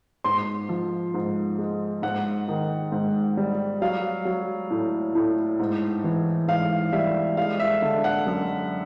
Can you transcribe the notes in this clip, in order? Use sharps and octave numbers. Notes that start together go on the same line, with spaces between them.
G#2 C6
F3
G#2
G#3
G#2 F#5
D#3
G#2
G3
F#3 F5
F#3
A2
A2
G#2
E3
G#2 F5
G3 E5
G#3 F5
E5
D3
F#5
F#2